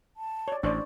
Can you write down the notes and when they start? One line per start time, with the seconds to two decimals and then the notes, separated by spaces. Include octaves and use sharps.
0.17 A5
0.48 C#5 D5
0.63 A1 D4 C5 D5 C#6